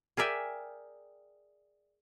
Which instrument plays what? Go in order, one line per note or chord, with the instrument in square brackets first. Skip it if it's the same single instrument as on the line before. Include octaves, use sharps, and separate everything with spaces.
[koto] G#4 A#4 D5 E5 G5 G#5